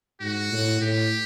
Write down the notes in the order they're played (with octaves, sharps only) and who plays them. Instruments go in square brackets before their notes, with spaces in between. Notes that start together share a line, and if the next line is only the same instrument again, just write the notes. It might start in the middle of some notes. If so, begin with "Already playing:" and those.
[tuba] G#2 [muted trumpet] F#4
[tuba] A2
[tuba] A2 [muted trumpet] G4